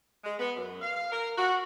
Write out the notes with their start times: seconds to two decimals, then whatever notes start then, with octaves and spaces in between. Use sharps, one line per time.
0.24 G#3
0.39 B3
0.56 F#2
0.82 F5
1.12 A#4
1.37 F#4